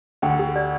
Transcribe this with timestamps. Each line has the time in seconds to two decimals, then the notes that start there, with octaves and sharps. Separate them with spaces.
0.22 D2 D3 G5
0.39 G4
0.56 D5